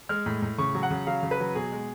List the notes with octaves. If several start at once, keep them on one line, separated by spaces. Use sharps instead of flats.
G#3 F6
A2
A2
C#3 C#6
F#3
F#5
C#3
F#3 F5
C#3
B4
F#3
B2 G#4
G#3